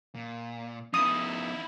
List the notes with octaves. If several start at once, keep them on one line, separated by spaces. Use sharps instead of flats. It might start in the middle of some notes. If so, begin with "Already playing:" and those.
A#2
F3 B3 D#4 E4 D#6